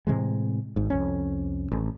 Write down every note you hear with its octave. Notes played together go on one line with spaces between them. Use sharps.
A2 C3 E3 G#3
G#1 G#2
C2 F2 C#4
A1